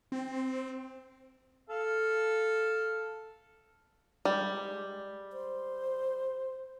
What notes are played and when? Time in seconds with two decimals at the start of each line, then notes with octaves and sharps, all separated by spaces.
0.12 C4
1.70 A4 F5
4.25 G3 G#3
5.33 C5